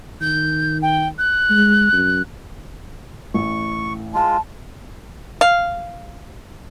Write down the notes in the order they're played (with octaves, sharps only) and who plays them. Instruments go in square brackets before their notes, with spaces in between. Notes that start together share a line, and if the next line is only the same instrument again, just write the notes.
[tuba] D#3 [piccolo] G6
[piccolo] G5
F#6
[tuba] G#3
F#2
[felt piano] A1 [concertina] C#6
[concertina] G#3 F4 [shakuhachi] A5
[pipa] F5